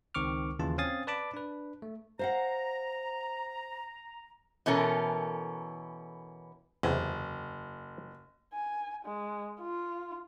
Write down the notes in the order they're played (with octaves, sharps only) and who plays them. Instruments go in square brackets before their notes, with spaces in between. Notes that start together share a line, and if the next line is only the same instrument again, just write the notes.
[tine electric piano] C#2 D#3 C4 C#6 D6 F6
D#2 C#3 E3 F4 A5
C4 C#4 F5 G#5 D#6 A6
B4 D5 A5 B5 D6
D4 B4
A3
[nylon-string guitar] C5 F5 F#5 [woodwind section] A#5
[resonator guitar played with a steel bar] B2 E3 C#4 A4 A#4
[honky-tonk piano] F#1 [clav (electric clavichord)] E2 C3 G#5
[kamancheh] G#5
G#3
F4